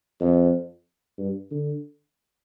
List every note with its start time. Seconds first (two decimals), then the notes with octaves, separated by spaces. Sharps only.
0.21 F2
1.18 G2
1.51 D3